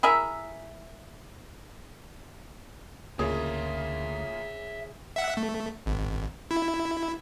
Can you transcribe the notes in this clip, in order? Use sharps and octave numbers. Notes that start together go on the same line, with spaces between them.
E4 G#4 A#4 E5
D2 C#3 A#3 F4 G#4 C#5 E5
E5 F#5
A3
G#1
E4